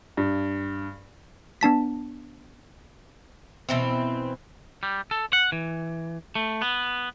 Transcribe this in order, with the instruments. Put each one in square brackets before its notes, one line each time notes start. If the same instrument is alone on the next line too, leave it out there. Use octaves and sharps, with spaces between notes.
[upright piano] G2
[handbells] B3 D4 A5 B6
[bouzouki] B2 E3 C4
[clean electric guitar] G3
A4
F#5
E3
A3
B3